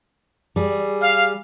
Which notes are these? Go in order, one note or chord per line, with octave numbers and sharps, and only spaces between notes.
G3 G#4
F5